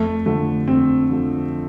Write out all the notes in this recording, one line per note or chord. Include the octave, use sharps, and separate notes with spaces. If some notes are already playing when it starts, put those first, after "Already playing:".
Already playing: F2 A3
D3 F3 A3
F2 C4
D3 F3